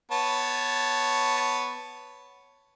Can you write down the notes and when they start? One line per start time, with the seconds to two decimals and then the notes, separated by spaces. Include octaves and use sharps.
0.12 B3 C#5 A5